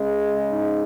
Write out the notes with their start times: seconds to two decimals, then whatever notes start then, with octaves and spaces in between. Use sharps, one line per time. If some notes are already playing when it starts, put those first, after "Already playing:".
Already playing: C#3 G#3
0.49 D#4